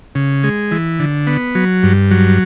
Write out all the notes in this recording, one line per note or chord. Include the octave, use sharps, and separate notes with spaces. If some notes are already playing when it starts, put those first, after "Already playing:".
C#3
G#3
E3
D3
B3
F#3
G2
F#3